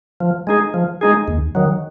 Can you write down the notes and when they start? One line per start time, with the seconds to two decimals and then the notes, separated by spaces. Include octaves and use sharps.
0.20 F3
0.47 G#3 D#4 G#4
0.74 F3
1.01 G#3 D#4 G#4
1.28 D#2
1.55 D#3 F#3